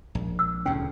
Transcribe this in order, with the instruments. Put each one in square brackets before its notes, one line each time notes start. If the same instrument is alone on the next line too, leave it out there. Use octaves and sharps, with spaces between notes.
[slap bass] A#1
[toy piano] E6
[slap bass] D2 C#3 [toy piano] C#4